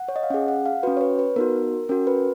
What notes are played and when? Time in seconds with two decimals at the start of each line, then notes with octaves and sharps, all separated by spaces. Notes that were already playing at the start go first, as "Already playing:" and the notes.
Already playing: F#5
0.08 C#5
0.16 D#5
0.23 F5
0.30 C#4 G#4 F#5
0.48 F#5
0.66 F5
0.83 C#4 F#4 B4
0.97 C#5
1.01 B4
1.19 B4
1.36 B3 D#4 F#4 A#4
1.89 C#4 F#4 A#4
2.07 B4